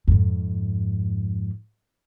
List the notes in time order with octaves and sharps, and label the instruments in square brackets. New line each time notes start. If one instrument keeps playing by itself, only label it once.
[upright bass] F2 G#2